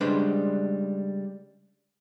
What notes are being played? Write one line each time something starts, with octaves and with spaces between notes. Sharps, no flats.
C#3 G3 G#3 D4 B4 C5